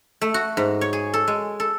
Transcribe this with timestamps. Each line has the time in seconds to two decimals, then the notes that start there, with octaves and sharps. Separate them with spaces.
0.21 A3
0.34 F#4
0.57 G#2
0.81 C#5
0.93 G#4
1.14 A4
1.28 G#3
1.60 A4